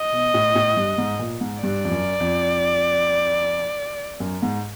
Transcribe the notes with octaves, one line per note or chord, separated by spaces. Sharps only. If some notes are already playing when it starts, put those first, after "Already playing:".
Already playing: D#5
B2
A2
A2
G2
G#2
A#2
G#2
G2 D5
F2
F#2
F2
F#2
G#2